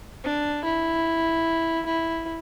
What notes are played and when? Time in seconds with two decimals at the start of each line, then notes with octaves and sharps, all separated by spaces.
0.24 D4
0.65 E4
1.86 E4